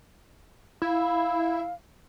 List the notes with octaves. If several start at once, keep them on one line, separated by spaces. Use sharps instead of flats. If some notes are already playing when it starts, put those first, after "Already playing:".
E4 F5